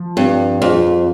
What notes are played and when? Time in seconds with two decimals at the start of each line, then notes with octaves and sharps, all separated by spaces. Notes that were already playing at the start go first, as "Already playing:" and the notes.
Already playing: F3
0.17 G2 C4
0.62 F2 G#4